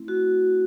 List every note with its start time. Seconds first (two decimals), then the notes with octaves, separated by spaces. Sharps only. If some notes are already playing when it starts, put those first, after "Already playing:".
Already playing: A3 C4 E4
0.08 F#4